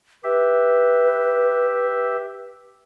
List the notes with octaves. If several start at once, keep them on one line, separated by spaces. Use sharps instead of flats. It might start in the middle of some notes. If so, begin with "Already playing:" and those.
G4 B4 E5